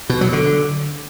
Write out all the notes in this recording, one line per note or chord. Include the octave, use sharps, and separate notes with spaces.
B2
F#3
D3